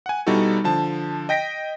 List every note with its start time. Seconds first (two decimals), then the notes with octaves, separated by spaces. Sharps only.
0.06 F#5 G#5
0.27 B2 G3 D#4 E4 F#4 A4
0.64 D3 F3 A5
1.29 D#5 G5 A#6 B6 D7